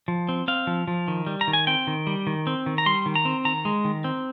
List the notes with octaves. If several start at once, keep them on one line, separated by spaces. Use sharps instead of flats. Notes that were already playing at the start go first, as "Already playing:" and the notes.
F3
C4
C4 F5
F3
F3
D#3
G3
A#5
D#3
G#5
C4 G5
D#3
G3
D#3
C4
D#3
A#5
G3 C6
D#3
A#5
C4
D#3 A#5
G#3
D#3
C4